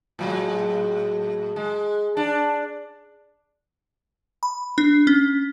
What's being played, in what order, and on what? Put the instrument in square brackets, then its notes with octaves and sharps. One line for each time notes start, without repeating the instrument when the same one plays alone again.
[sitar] A2 F#3 G#3
G#3
D4
[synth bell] B5
D4
C#4